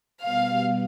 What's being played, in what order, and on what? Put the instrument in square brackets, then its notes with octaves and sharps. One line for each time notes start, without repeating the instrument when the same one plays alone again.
[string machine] B2 G3 B3 [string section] F5